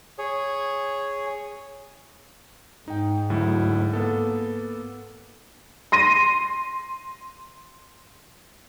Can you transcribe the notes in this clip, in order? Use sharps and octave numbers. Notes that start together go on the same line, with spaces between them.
G#4 C#5
G#2 D#4 G5
D2 F#3 E4
A#3 B3 A4
C6 A#6 D#7